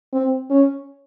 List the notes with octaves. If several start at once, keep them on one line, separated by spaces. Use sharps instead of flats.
C4
C#4